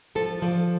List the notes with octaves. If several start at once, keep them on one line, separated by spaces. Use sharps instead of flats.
F3 A4
F3 D5